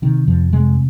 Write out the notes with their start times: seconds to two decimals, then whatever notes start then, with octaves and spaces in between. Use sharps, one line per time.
0.02 C3 D#3
0.27 F2 F3
0.52 C3 G#3